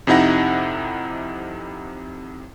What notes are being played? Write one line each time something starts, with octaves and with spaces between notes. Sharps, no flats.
F2 C3 D#4 E4 F#5 A#6